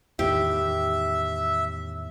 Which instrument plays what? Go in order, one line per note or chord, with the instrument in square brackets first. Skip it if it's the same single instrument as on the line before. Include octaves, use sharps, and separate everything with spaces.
[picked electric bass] E2 A2 D#3 [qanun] G4 [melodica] E5